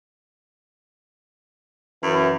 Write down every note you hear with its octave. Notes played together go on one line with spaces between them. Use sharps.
F#2 E3